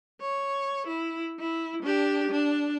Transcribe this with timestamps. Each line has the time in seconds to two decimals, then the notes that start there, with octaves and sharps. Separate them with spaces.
0.21 C#5
0.87 E4
1.39 E4
1.83 D4 G4
2.31 D4